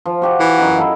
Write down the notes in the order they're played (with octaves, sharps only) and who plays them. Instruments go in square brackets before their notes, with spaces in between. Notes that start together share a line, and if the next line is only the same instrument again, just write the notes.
[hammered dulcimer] F3
F#4 G4 F#5
[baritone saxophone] E3
[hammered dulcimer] F#2 D#4 F#5
E4 A4 F5